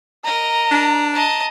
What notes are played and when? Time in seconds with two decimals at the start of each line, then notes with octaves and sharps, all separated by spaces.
0.24 A#4 D#5 A#5
0.71 D4
1.13 D#5 A5 A#5